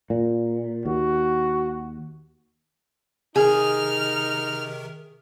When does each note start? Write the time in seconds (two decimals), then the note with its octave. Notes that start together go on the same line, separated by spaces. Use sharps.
0.10 A#2
0.85 D#2 F#4
3.36 C3 D#3 D#4 G#4 A#4 F6